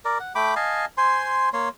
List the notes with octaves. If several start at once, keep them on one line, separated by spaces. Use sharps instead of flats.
A#4 D5
F#5
A3 G5 B5 D6
D#5 F5 G#5 A5
C5 G#5 C6
A#3 C#5 C6